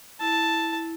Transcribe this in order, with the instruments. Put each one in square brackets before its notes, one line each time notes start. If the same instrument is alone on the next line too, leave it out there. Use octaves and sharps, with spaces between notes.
[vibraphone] E4 [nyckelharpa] A5